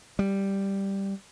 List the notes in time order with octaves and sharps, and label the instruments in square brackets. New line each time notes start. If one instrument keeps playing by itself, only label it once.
[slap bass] G3